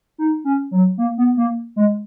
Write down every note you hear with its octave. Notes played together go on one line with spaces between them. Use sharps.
D#4
C#4
F#3
A#3
B3
A#3
G#3